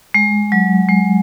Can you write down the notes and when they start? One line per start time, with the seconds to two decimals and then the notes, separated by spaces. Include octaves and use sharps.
0.14 G#3
0.52 F#3
0.89 G#3